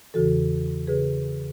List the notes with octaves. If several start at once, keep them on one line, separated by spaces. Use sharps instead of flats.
E2 C#3 E3 F#4 A4
C#3 G#4 B4